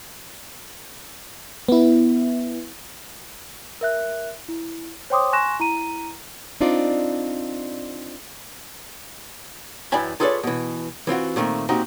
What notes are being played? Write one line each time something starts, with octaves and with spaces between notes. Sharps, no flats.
B3 E4
A#4 E5 F#6
E4
C5 C#5 G5 C6 D6 D#6
G#5 C6 C#6 F#6 A#6 E7
E4 A#5 D#7
C4 D4 D#4 F4 D5
F#2 E3 D5 G5 G#5 B5
F4 G#4 A4 B4 C#5 D5
B2 E3
E3 C4 F4 F#4
A#2 D#3 A3 C4
A#2 C4 D#4 F#4 G4